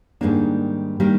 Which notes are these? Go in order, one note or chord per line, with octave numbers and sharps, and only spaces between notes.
G#2 D#3 G3 A#3 D4
D#3 G3 A#3 D4